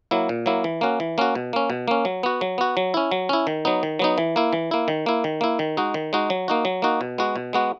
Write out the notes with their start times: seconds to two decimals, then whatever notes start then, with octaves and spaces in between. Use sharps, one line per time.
0.11 F#3 A#3 E4
0.29 A#2
0.46 F#3 A#3 E4
0.64 E3
0.81 A#3 C#4 F#4
1.00 E3
1.18 A#3 C#4 F#4
1.35 B2
1.53 A#3 C#4
1.70 B2
1.88 A#3 C#4
2.05 F#3
2.23 B3 F#4
2.41 F#3
2.58 B3 F#4
2.77 F#3
2.94 C#4 E4
3.11 F#3
3.29 C#4 E4
3.47 D#3
3.65 F#3 B3 D#4
3.83 D#3
3.99 F#3 B3 D#4
4.18 E3
4.36 A#3 E4
4.53 E3
4.71 A#3 E4
4.88 D#3
5.06 A#3 E4
5.24 D#3
5.41 A#3 E4
5.59 D#3
5.77 G#3 D#4 F#4
5.94 D#3
6.13 G#3 D#4 F#4
6.30 F#3
6.48 A#3 D#4 F#4
6.65 F#3
6.82 A#3 D#4 F#4
7.01 B2
7.18 G#3 B3 F#4
7.36 B2
7.53 G#3 B3 F#4